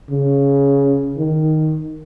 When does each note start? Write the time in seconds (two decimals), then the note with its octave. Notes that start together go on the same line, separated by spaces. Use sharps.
0.10 C#3
1.17 D#3